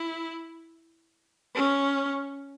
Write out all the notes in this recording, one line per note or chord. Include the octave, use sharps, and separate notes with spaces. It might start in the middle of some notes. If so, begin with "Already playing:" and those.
Already playing: E4
C#4